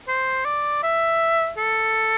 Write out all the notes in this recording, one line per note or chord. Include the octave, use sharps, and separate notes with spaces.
C5
D5
E5
A4